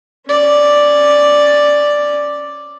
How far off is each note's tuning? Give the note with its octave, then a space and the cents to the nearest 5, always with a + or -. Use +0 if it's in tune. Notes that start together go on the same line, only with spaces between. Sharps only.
C#4 -5 D5 +0